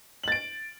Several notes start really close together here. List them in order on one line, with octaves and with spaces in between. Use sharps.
F#7 A6 D7